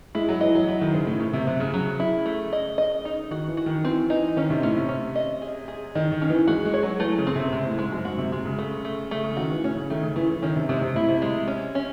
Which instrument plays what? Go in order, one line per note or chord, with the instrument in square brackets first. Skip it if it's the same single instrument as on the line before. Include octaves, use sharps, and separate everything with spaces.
[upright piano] G#3 [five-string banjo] E4
[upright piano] F#3
[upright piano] E3 [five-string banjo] D#5
[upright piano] F#3
[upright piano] F#3 [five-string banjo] E4
[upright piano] D#3
[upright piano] C#3 [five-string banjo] C5
[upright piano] A2
[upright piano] A2 [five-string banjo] D#3
[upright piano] C3
[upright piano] C3 [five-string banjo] F#3
[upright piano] C#3
[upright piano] C#3 [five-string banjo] F#3
[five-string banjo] E4
A3
D#5
D#5
D#4
[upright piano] D#3 [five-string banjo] F#4
[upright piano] E3
[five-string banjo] F#4
[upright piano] D#3
[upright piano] E3 [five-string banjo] C4
[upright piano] E3 [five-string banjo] D#4
[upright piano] D#3 [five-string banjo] C#4
[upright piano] C3
[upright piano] A2 [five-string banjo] C#4
[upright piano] C3
[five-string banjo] C#4
D#5
G#4
G#4
[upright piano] D#3 [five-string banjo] D#5
[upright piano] D#3
[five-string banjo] C#4
[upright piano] E3
[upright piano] G#3 [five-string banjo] F#4
[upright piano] G#3
[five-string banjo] C#5
[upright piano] F#3
[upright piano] E3 [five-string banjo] A3
[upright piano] C#3
[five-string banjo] C4
[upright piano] C3
[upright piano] C3 [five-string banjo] G#3
[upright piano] A2
[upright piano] G#2 [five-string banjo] G#3
[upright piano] F#2
[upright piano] G#2 [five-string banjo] F#4
[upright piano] C3
[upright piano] C3 [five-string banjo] G#3
[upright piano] C#3
[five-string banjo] A3
A3
[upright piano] C#3 [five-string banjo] A3
[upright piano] C#3
[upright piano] D#3 [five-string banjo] F#4
[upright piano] E3
[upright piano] A2 [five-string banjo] C#4
[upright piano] C#3
[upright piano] D#3 [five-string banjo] A3
[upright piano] C#3
[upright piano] E3 [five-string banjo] A3
[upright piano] E3
[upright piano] D#3 [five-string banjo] C#4
[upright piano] C3
[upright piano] C3 [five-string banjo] G#3
[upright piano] C3
[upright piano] A2 [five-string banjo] E4
[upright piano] C3
[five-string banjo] G#3
C#4
C#4